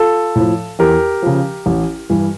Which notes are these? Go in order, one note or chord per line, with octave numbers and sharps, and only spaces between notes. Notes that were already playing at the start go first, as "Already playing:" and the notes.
Already playing: F4 A4
A2 F3
E2 G4 A#4
C#3 F3
A1
G2 E3